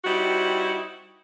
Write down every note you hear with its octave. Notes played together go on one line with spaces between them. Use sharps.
G3 C4 D#4 E4 F#4